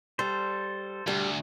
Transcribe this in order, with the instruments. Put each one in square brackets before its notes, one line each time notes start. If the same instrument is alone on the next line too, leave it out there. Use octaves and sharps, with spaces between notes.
[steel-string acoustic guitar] G3 [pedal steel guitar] A4 C5
[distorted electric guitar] D2 [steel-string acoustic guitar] G3